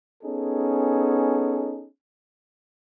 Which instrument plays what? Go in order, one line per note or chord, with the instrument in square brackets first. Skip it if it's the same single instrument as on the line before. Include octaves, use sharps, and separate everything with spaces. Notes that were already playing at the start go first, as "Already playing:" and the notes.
[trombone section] B3 C#4 D#4 G#4 A4